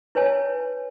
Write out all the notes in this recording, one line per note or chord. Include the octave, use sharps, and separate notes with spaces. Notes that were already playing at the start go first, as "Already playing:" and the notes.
E4 B4 C#5 G#5 A5